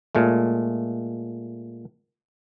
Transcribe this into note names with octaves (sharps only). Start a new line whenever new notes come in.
A#2 G#3 A3